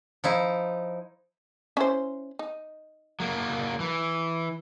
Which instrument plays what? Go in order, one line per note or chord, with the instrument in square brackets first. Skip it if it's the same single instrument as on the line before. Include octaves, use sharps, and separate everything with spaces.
[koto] F3 D#4 E4
[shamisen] C#4 E4 C5
D#4
[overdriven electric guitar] F#3 A#3
E3